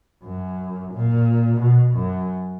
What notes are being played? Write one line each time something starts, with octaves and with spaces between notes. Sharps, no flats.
F#2
A#2
B2
F#2